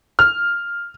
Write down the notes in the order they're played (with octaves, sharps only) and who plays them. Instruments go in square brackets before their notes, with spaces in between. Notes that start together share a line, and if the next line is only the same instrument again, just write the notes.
[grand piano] F6